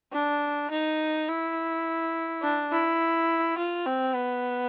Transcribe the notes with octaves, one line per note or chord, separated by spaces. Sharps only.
D4
D#4
E4
D4
E4
F4
C4
B3